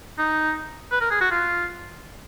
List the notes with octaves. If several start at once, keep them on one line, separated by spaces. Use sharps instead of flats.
D#4
B4
A#4
G#4
F#4
F4